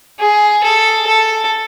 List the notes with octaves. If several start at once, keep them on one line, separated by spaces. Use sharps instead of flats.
G#4
A4
A4